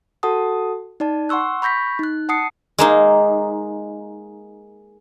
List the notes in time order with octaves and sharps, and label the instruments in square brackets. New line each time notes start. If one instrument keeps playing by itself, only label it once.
[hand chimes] F#4 A4 F#5 A5 D#6
D#4 D5 A5
F#5 C6 C#6 E6 F#6
B5 C#6 G6 A#6 B6
D#4 F#6
F#5 A5 D#6 C7 C#7
[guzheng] G#3 A#3 D#4